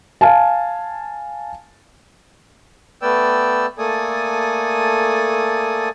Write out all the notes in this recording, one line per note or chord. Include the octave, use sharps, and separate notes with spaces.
F5 G#5 A5
A3 B3 B4 D5 G5 E6
A3 A#3 A4 D5 G#5 D#6